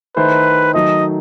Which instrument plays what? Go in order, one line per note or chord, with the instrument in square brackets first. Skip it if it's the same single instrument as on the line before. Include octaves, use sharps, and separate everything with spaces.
[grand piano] D#3 A3 E4 A4 C5 [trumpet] B4
[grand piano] D#3 F#3 A3 D#4 A4 [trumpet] D#5